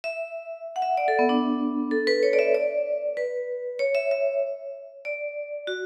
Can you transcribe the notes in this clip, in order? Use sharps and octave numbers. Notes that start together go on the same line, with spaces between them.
E5
F#5
E5
D5
A4
B3
D4
A4
B4
C#5
D5
E5
D5
B4
C#5
E5
E5
D5
F#4